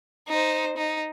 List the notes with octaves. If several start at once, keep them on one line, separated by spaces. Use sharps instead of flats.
D#4 C5
D#4